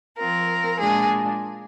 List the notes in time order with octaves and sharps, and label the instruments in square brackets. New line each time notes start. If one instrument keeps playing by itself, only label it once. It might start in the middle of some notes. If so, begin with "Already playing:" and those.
[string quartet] F3 C4 F4 A#4
A#2 G#3 D4 F4 G#4